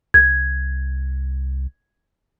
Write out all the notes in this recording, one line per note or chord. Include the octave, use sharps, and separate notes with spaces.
C2 G#6